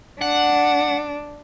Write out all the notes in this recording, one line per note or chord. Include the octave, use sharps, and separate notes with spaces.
D4 F#5